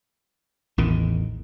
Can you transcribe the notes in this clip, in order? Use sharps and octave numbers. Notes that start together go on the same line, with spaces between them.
A1 E2 D#3